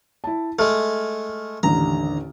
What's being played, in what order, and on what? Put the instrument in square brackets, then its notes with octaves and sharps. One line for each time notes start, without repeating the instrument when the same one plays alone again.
[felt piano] E4 A5
[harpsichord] G#3 A3 [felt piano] F6
[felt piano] A1 D#2 D3 [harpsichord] A#5